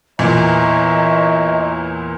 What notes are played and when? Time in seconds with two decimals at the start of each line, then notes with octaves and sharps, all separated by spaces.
0.19 E2 A#2 C#5 D#5 E5 A#5